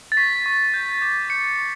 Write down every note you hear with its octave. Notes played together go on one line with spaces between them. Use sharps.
A6
C#6 B6
C#6
G6
D6
G6 C#7
C#6